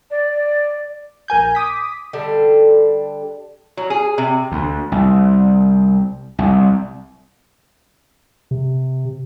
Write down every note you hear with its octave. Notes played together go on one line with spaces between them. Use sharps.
D5
A#1 A#4 G#5 G6
D6 D#6 B6
D3 G3 D4 A4
F#3
G#4
C3
D2
C2
C2
C3